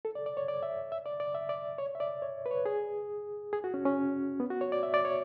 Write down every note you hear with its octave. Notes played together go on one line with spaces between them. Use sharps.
A4
D5
D5
C#5
D5
E5
E5
D5
D5
E5
D5
C#5
E5
D5
C#5
B4
C#5
G#4
G#4
F#4
C#4
C#4
B3
F#4
C#5
D5
E5
D5
C#5